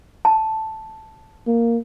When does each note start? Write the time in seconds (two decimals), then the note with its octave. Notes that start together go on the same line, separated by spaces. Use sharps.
0.25 A5
1.47 A#3